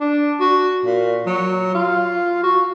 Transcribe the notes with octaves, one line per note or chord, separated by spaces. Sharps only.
D4
F#4
A#2
F#3
F4
F#4